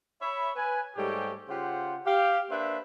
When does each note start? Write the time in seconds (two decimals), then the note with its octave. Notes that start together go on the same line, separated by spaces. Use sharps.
0.22 C#5 E5 B5
0.56 B4 G#5
0.96 G#2 G3 A3 G4 G#4 C#5
1.49 C#3 F4 G4 C5 F#5
2.06 G4 F5
2.51 A#3 D4 B4 C5 E5